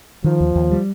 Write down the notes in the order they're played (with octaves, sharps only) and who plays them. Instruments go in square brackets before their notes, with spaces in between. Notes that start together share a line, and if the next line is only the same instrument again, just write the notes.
[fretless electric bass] D#3 [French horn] F3
[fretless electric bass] D#2
D#2
G3